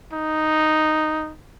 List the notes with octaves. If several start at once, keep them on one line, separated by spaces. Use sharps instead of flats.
D#4